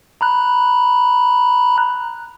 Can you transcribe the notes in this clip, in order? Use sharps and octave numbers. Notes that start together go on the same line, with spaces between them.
A#5 B5 F#6